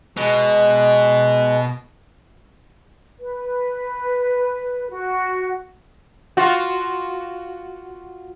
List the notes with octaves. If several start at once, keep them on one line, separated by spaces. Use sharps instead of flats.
B2 G#3 F#6
B4
F#4
F4 F#4